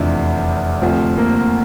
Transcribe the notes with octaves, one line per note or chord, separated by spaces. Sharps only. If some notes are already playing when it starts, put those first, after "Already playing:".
Already playing: F1 E2 C3 F3 D4 E4
D2 C3 F3
A#3